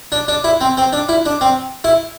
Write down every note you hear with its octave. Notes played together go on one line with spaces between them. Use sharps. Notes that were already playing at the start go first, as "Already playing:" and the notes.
D4
D4
E4
C4
C4
D4
E4
D4
C4
E4